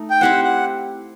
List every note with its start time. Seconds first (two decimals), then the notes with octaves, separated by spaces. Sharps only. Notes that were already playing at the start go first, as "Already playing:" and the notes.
Already playing: A3 D#4
0.10 G5
0.21 C4 E4 G4 C5 F#5
0.44 F#5